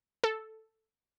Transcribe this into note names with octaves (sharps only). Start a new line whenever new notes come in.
A4